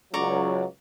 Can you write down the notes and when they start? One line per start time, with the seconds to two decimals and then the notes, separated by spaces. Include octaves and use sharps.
0.14 C#2 F#3 D5 A#5 C#6